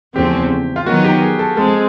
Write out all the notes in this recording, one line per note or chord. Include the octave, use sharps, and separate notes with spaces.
E2 C#3 F3 A3 C4 G4
F4
D#3 F#3 B3 D#4 F#4
G4
G#4
A4
F3 G#3 C4 A4
G#4